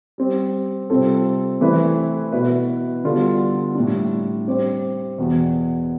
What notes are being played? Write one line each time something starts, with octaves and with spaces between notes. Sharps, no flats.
G3 C4 G4
C3 G3 C4 F4 A4
E3 A3 C4 E4 B4
B2 B3 E4 B4 E5
D3 G3 B3 F4 A4
A2 G3 D4
G3 C4 G4 C5
E2 B2 B3